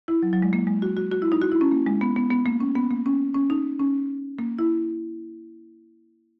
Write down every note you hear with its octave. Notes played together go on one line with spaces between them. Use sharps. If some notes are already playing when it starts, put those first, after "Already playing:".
E4
F#3
F#3
G#3
A#3
G#3
F#4
F#4
F#4
E4
D#4
F#4
E4
C#4
A#3
G#3
B3
B3
B3
A#3
C#4
B3
A#3
C#4
C#4
D#4
C#4
A#3
E4